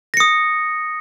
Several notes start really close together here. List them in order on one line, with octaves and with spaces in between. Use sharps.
A#6 C#7 D#6